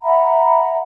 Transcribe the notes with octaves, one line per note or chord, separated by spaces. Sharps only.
E5 F#5 A#5 B5